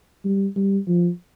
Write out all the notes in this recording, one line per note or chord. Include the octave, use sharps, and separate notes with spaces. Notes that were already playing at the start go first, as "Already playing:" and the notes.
G3
G3
F3